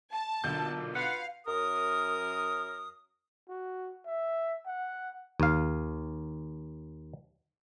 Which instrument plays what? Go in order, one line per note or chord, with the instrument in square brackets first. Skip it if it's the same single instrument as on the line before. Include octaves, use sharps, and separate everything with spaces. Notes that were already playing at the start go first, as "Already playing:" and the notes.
[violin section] A5
[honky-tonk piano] B1 D3 G6 [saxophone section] A#2
[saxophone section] F4 B4 F#5 [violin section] F5
[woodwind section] F#2 A#4 D#6
[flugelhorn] F#4
E5
F#5
[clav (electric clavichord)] D#2 F5